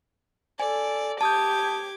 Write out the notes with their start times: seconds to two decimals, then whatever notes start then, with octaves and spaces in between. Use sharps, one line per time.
0.60 A4 D5 G#5
1.21 G4 A5 D6 D#6 G6 G#6